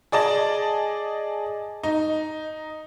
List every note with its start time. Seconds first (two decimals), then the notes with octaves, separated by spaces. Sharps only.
0.12 G#4 D5 D#5 A5
1.83 D#4